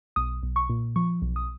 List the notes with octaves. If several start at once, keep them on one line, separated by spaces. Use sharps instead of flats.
B1 D#6
B1
C#6
A#2
F3 C#6
B1
D#6